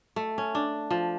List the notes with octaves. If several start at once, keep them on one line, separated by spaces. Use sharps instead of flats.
A3
C#4
D4
F3